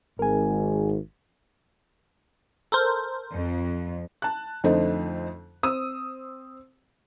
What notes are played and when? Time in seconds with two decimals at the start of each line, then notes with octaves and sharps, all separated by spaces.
0.19 G#1 G#2 A#4 G#5
2.72 A4 A#4 C5
3.33 F2
4.22 A5 F#6
4.64 F2 D3 A3 C4 D#4
5.63 C4 D#6 E6